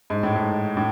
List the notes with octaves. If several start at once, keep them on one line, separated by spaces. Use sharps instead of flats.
G#2
A2
G#2
A2